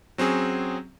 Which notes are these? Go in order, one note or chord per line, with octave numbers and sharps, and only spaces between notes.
F#3 C4 C#4 G#4